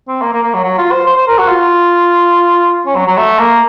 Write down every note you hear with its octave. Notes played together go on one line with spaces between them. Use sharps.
C4
A#3
A#3
A#3
F#3
F#3
F4
C5
C5
C5
A#4
F#4
F4
C#4
F#3
F#3
A3
A#3